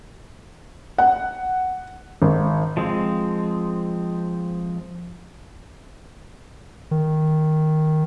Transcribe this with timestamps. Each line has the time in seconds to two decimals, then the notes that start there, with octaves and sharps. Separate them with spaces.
0.98 F#5
2.22 G#1
2.77 F3 G#3 C4
6.91 D#3